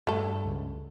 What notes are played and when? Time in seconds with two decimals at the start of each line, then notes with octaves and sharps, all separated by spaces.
0.07 G2 A3 A4
0.45 C#2